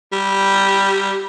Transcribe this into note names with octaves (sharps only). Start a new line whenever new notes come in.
G3